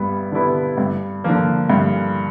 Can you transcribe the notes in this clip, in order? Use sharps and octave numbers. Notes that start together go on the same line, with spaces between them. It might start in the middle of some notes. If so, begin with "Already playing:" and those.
Already playing: G2 G3 B3 E4
D3 G3 B3 E4
G2
D3 F3 A#3
G2